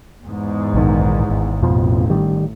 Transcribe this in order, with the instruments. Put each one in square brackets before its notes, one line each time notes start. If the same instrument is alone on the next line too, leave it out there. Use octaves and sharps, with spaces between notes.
[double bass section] E2 G#2
[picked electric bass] A#1 D#3
G#1
[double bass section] A1 [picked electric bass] F2 B2 F3
[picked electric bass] D#3 G3